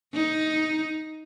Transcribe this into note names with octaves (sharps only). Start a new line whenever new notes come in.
D#4